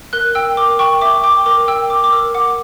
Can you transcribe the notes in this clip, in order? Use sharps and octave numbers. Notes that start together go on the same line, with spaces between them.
A#4 F#6
G5 E6
A#4 D6
G5 C#6
E5 D6
G5 D6
A#4 D6
G5 E6
A#4 D6
D6
A#4 E6
F#5 D6